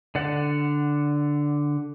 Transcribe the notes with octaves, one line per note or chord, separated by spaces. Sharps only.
D3 D5 F#5